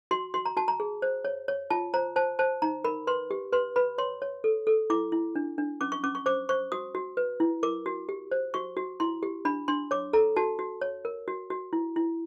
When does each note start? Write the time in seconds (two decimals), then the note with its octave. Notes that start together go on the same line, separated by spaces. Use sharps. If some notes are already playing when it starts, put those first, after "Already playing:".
0.11 F#4 C6
0.34 F#4 C6
0.46 A#5
0.57 F#4 A5
0.68 A#5
0.80 G#4
1.02 C5
1.25 C#5
1.48 C#5
1.70 F4 A5
1.94 C5 A#5
2.16 C5 A5
2.39 C5 A5
2.62 D#4 A#5
2.84 A#4 B5
3.07 B4 C6
3.31 G4
3.53 B4 C6
3.76 B4 B5
3.98 C#5 C6
4.22 C#5
4.44 A4
4.67 A4
4.90 E4 D6
5.12 E4
5.36 D4
5.58 D4
5.81 C#4 D6
5.92 C#6
6.04 C#4 D6
6.15 C#6
6.26 C5 D6
6.49 C5 C#6
6.72 F#4 D#6
6.95 F#4
7.17 B4
7.40 E4
7.63 A#4 D6
7.86 F#4
8.09 G4
8.31 C5
8.54 F#4 C#6
8.77 F#4
9.00 E4 C6
9.23 G4
9.45 D4 B5
9.68 D4 C6
9.91 C#5 D6
10.13 A4 A#5
10.36 F#4 A5
10.59 F#4
10.81 C#5
11.05 A#4
11.28 F#4
11.50 F#4
11.73 E4
11.96 E4